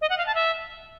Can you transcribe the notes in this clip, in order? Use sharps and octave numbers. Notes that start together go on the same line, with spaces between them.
D#5
F#5
F5
A5
E5